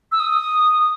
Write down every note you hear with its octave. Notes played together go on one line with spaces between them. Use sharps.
E6
D#6